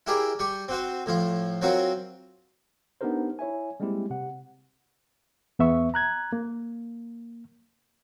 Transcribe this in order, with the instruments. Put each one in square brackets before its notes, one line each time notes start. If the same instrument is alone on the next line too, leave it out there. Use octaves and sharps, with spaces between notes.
[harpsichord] E4 G4 G#4 A#4 D5
G3 G4 C#6
C4 F#4 C5
A2 F3 F4
F#3 C4 F4 F#4 A#4 C#5
[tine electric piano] B3 D4 D#4 G4 A#4 C5
E4 C#5 E5 G#5
G3 G#3 A#3 C4 E4 G4
C3 F#5
[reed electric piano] E2 B3 E5 C#6
A#5 F#6 G#6
A#3